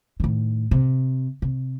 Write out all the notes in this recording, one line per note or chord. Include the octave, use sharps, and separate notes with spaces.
A2 D#3
C3
C3